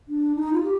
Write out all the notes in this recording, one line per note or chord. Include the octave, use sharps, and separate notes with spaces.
D4
D#4
F4
G4